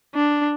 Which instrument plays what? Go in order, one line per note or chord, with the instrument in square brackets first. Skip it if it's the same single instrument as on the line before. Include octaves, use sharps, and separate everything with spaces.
[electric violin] D4